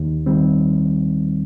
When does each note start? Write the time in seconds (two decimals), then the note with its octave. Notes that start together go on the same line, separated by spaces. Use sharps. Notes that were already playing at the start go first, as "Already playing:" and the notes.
Already playing: D#2
0.26 D#3 G3 C4